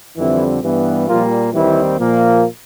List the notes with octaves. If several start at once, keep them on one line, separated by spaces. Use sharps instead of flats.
F2 D3 E3 G3 C4 E4
G2 E3 G3 B3
A#2 F3 G3 A#3 F4
D#2 D#3 E3 G3 C4 E4
A#2 F3 A#3